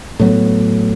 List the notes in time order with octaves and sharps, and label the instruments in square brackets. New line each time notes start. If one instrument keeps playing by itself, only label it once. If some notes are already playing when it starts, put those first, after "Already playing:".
[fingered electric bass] A2 F#3 B3